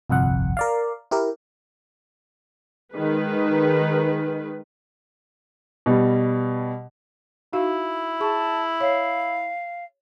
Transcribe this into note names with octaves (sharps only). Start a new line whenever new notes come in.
G1 C2 F2 F#5
A#4 D5 F5
E4 G4 A#4
D#3 G#3 B4
B2 G3
D#4 E4 F#4 F5
G#4 A5 C#6
C#5 F5